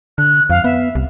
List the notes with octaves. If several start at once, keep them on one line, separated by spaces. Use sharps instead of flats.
D3 F#6
F2 F5
B3 E5
C2